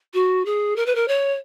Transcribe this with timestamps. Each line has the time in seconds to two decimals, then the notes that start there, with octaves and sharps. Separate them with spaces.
0.14 F#4
0.45 G#4
0.76 A#4
0.86 B4
0.95 A#4
1.08 C#5